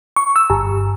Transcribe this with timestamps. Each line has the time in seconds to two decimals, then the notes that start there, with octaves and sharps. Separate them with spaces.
0.16 C#6
0.36 E6
0.50 G1